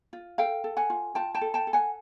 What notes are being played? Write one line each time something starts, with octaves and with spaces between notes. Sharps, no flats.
F4
A4 F5 G5
A4
F#5 G#5
F4
F4 G5 A5
G5 A5
A4
G5 A5
A4
F#5 G#5